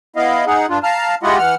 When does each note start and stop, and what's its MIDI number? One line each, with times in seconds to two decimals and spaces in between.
0.16 0.45 59
0.16 0.45 64
0.16 0.45 75
0.16 0.45 77
0.47 0.66 63
0.47 0.66 68
0.47 0.66 78
0.69 0.79 43
0.69 0.79 62
0.69 0.79 65
0.83 1.15 77
0.83 1.15 81
0.83 1.15 82
0.83 1.15 89
1.23 1.38 56
1.23 1.38 64
1.23 1.38 65
1.23 1.38 67
1.23 1.38 75
1.23 1.38 78
1.38 1.55 52
1.38 1.55 78
1.38 1.55 89